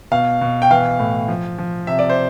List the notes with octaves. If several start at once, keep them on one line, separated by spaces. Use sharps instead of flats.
B2 F5
B2
G5
E3 F5
A2
F3
F3
C3 E5
D5
C5